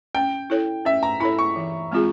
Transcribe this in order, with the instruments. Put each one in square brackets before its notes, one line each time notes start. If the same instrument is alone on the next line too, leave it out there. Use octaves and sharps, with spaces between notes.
[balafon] C#4 [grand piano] G5
[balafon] E4 A4 C#5
[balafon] C#4 [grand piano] E5
[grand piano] A#5
[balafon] E4 A4 C#5 [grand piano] B5
[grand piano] C#6
[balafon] E3
G#3 C4 F4 G#4